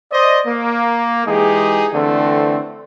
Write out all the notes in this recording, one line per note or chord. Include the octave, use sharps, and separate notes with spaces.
C5 D5 D#5
A#3
E3 G#3 D#4 G4 G#4
D3 E3 A3 C4